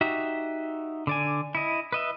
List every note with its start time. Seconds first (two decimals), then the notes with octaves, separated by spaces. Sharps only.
0.01 D#4 F#4 G4 E5
1.07 D3 D5 G#5
1.55 E4 D#5
1.92 B4 D#5 E5